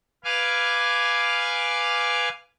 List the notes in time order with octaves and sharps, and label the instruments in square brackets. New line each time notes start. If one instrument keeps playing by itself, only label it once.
[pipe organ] B4 F5 G#5 D6 F6